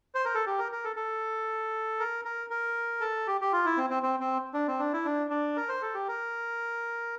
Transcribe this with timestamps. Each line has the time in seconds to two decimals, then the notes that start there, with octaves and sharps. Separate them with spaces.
0.15 C5
0.25 A#4
0.35 A4
0.46 G4
0.59 A#4
0.72 A#4
0.84 A4
0.96 A4
2.00 A#4
2.25 A#4
2.50 A#4
3.01 A4
3.27 G4
3.41 G4
3.52 F4
3.66 E4
3.77 C4
3.90 C4
4.03 C4
4.20 C4
4.54 D4
4.68 C4
4.79 D4
4.93 E4
5.05 D4
5.30 D4
5.57 A#4
5.69 C5
5.82 A4
5.94 G4
6.08 A#4